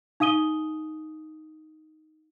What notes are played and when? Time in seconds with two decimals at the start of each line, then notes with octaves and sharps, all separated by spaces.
0.20 D#4 F5 D#6 D#7 G7